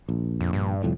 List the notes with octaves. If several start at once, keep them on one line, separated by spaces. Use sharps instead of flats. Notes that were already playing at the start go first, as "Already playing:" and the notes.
A#1
F2
G2
C2 F2 A2